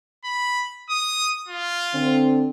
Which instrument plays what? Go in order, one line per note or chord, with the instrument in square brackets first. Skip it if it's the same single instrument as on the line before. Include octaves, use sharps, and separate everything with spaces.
[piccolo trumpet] B5
D#6
F4
[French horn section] D3 C4